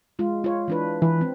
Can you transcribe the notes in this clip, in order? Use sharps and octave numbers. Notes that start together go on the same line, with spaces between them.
G#3 F4
F4 C#5
E3 D4 B4
E3 B4
C4